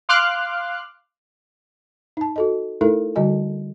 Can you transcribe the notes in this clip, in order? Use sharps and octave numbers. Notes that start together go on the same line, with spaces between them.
F5 C6 D6 F6 F#6
D#4 A5
F#4 A4 D#5
A3 D#4 E4 A4 A#4
D3 G3 F#4 D#5 G#5